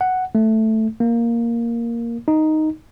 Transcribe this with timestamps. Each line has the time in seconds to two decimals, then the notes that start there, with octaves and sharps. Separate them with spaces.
0.01 F#5
0.35 A3
1.00 A#3
2.28 D#4